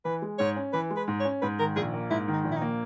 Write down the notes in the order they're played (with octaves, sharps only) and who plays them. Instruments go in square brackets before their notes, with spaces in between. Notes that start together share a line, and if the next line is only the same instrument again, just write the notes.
[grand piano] E3 [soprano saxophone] B4
[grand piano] G#3
[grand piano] G#2 [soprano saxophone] C#5
[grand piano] C#4
[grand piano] E3 [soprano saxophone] B4
[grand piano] G#3
[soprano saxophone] B4
[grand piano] G#2
[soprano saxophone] C#5
[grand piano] C#4
[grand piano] G#2 [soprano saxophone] B4
[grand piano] D#3 [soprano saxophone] A#4
[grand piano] A#1 [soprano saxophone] G#4
[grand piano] A#3
[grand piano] G#2 [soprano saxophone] E4
[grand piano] D#3
[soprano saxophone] D#4
[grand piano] A#1
[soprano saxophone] E4
D#4
[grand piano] A#3